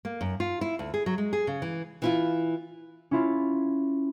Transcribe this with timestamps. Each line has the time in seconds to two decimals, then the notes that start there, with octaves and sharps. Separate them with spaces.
0.05 A#3
0.21 F#2
0.40 F4
0.61 E4
0.79 D2
0.94 G#4
1.06 F#3
1.18 G#3
1.33 G#4
1.47 C#3
1.62 E3
2.02 E3 E4 F4
3.11 C#4 E4 F4